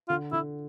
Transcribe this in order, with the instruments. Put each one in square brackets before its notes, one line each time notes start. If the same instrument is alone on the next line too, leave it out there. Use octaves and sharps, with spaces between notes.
[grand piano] D3 [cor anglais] F4
[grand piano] D3 [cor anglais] E4